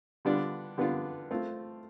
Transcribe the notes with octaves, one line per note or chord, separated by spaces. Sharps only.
D3 G3 B3 D4 F4
D3 G3 B3 D4 F4
A3 C4 F4